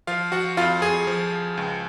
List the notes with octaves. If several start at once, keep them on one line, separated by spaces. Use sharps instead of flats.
F3 F4 F5
F3 F#4 F#5
F2 F4 F5
F2 G#4 G#5
F3
F3
C#2